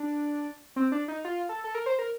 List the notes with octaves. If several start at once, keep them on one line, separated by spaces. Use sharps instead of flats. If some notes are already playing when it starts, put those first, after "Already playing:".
Already playing: D4
C4
D4
D#4
F4
A4
A4
A#4
C5
A#4